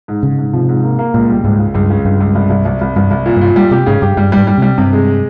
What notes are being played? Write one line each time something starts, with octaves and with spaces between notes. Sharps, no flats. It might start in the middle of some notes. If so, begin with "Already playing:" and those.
G#2
G#2 C#3
G#2
C3 F3
G#2
A#3
A#3
C#2 A#2
G3
C#2 G#2
C#3
C#2 G2
C#3
C#2 G2
C#2
C2
C2
C2
C2
C2 G2
C2
A#2
G2 A#2
G3
C3 G4
G#2 C#3
G2 G4
G2 G3
G#2 G3
G3
C3 G3
G2 C3
G#3